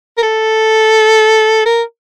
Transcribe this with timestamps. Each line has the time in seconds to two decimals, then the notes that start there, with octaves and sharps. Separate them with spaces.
0.18 A#4
0.23 A4
1.66 A#4